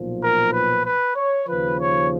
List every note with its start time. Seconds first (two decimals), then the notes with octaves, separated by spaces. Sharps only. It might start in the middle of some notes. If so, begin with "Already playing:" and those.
Already playing: B1 A#2 F3
0.22 A#4
0.53 B4
0.85 B4
1.16 C#5
1.48 D#2 C#3 F3 B4
1.80 C#5